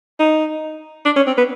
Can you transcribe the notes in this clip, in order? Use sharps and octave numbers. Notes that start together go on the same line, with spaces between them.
D#4
D4
C#4
C4
B3